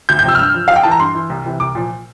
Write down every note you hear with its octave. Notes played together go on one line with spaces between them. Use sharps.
D2 G6
G6
C3 F3 E6
F6
G2 E6
F3
F2 F5
G5
E3 A5
A#5
G2 C6
E3
C2
C3 E3
C2 D6
A#2 F3